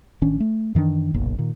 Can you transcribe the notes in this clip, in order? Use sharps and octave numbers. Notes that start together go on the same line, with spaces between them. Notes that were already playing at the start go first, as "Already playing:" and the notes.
A1 D#3 C#4 D4
A3
F#2 D#3 E3 D4
F#1 B1 A#2
A#2 D#3